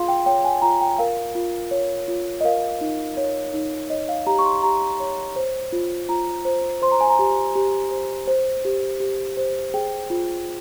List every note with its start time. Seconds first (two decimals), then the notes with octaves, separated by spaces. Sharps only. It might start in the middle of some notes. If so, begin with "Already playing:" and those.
Already playing: F4 G#4 F5 C6
0.08 G5
0.26 C#5 G5
0.44 G#5
0.62 F4 A#5
0.81 G5
0.98 A#4 F5
1.35 F4
1.71 C#5
2.08 F4
2.41 D#5
2.44 A#4 F5
2.81 D#4
3.17 C#5
3.54 D#4
3.90 C#5 D#5
4.09 F5
4.27 G4 A#5
4.39 C#6
4.45 C6
4.63 G4 A#5
5.00 C#5
5.36 C5
5.72 F4
6.09 F4 A#5
6.45 C5
6.82 C5 C6
6.91 A#5
7.01 G#5
7.10 A#5
7.19 G4
7.55 G4
7.91 C5
8.27 C5
8.65 G4
9.00 G4
9.37 C5
9.74 G#4 G5
10.10 F4